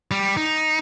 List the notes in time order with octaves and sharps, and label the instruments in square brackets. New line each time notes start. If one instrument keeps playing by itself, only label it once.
[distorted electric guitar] G3
D#4